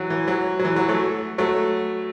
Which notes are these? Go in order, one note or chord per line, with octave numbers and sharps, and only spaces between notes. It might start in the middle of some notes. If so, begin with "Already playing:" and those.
Already playing: E3 F#3
E3
F#3
F#3
E3
F#3
F#3 A3
F#3 A3